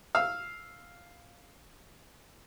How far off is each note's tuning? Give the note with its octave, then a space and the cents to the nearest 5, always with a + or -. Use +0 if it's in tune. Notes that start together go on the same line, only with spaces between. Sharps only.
F5 +0 E6 +0